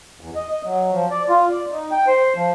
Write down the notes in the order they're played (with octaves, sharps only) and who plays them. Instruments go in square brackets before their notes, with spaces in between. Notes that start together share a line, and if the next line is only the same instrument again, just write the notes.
[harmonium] E2
D#5
D#5
F#3
F3
D5
F4
D5
D#4
G5
C5
F3